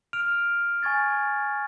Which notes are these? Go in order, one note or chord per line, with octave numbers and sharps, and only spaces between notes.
F6 D7 F7
G#5 C#6 G#6 A6